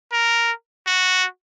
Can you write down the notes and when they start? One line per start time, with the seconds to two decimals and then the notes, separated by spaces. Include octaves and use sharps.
0.12 A#4
0.87 F#4